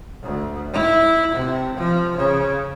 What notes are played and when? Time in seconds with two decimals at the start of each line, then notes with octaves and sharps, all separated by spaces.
0.22 D2
0.73 E4
1.34 C3
1.76 F3
2.17 C#3